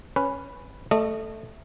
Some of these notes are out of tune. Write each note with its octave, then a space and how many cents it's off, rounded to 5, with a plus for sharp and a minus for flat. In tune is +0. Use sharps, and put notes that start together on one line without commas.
C#4 +0 B4 +0
A3 +0 D#5 -30